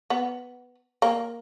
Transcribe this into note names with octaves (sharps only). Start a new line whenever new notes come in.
B3
A#3